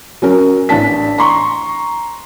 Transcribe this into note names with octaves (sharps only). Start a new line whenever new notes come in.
F#3 C#4 A#4
A1 D4 A5 B6
A#5 C6 C#6